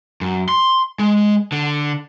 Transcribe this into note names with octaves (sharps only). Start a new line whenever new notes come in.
F#2
C6
G#3
D3